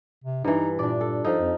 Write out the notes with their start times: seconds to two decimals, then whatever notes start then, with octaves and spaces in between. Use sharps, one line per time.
0.24 C3
0.44 G2 E3 D#4
0.79 A#2 D4 D5
1.01 A4
1.25 F3 D#4 A4
1.40 F2